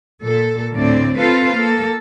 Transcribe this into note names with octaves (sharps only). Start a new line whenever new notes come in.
A#2 A4
D2 A2 D3 C4 D5
C4 F4 A4 B4 C5 F5
A#3 A4